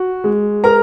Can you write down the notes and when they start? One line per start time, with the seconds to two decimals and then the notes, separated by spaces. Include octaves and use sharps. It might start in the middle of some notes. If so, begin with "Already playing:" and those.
Already playing: F#4
0.24 G#3
0.64 A#4 A#5